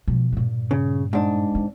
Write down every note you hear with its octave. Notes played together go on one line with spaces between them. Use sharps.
B2 F3
G2 A#2
C#3
G#2 D4
C4